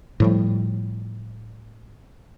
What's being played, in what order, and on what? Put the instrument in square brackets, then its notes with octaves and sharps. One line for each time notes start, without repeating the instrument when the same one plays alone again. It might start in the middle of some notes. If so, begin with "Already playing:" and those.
[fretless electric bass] A2 F3 G3